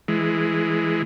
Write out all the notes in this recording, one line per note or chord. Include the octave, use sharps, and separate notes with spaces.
E3 G#3